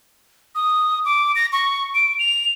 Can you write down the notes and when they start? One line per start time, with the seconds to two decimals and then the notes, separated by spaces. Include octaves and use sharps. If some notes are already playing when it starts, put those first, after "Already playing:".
0.55 D#6
1.05 D6
1.36 A#6
1.52 C#6
1.95 D7
2.19 F7